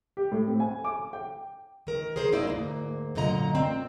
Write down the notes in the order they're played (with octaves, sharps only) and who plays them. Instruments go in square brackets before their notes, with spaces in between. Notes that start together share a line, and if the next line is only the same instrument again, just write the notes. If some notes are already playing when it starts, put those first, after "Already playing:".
[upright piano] G4
A2
C4
G#5
D6
G5
[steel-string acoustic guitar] D#3 A#4
G#4 A#4 C5
F#2 A#3 D#4 E4 D5
D2 G#2 A#3
F#2 A#2 D3 D#5 A#5
A#2 C4